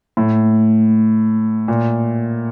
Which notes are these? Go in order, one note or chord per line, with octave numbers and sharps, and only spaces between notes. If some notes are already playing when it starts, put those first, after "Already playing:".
A2
A#2